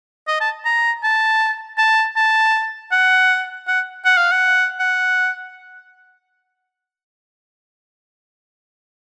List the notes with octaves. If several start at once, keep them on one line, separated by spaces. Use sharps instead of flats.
D#5
A5
A#5
A5
A5
A5
F#5
F#5
F#5
F5
F#5
F#5